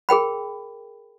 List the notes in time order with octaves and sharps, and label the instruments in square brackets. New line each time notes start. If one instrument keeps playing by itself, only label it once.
[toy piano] G#4 A#4 G5 B5